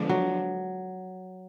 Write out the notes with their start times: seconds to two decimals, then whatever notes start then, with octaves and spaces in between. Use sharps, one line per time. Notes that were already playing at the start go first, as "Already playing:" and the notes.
Already playing: D3 F3 G#3 B3 D4
0.09 F#3